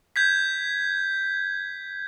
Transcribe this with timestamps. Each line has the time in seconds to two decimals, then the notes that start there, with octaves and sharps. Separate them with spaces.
0.16 G6 G#6 B6